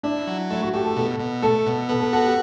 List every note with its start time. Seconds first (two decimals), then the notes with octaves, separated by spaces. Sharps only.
0.03 D4 E4
0.27 F#3
0.50 A3 E4
0.62 F#4
0.73 A3 G4
0.84 A4
0.96 B2 A4
1.20 B2
1.42 A3 A4
1.66 B2
1.89 B3 A4
2.00 A4
2.13 F#4 A4
2.24 G4